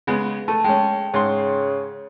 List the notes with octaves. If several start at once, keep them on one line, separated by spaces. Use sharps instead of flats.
C#3 G#3 B3
A3 A5
G#3 C#4 G5
G#2 C#3 C6